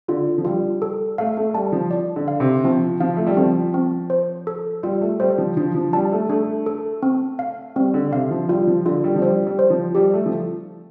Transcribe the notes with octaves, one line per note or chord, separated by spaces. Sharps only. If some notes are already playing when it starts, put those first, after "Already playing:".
D3 F4
F3
G3 F4
A4
A3 F5
A3
G3 A5
F3
D5
D3
F5
C3
F3 C4
F3 F5
A3
G3
F3 C4
C4
C5
A4
G3 F4
A3
G3 C5
G3
F3
F3 D4
F3
G3 A5
A3
A3 D4
A4
C4
F5
G3 C4
D3
C3 F5
F3
G3 F4
F3
D3 F4
G3
F3
G3 C5
G3
C5
F3
G3 G4
A3
F3